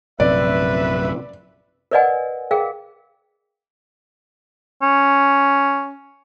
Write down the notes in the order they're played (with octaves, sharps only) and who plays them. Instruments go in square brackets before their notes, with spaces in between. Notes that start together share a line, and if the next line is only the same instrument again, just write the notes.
[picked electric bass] A#1 F#2 C3 [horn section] B4 E5 [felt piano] D5
[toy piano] A#4 B4 D5 D#5 F#5 G#5
G#4 A#4 F5 G5
[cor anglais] C#4